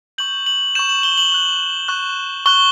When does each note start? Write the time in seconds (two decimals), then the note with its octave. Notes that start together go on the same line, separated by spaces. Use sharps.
0.18 C#6 G6 F#7
0.46 F#7
0.75 C#6 G6 E7
0.89 F#7
1.03 G7
1.18 F#7
1.32 C#6 F#6
1.88 C#6 F#6
2.46 C#6 F#6 G7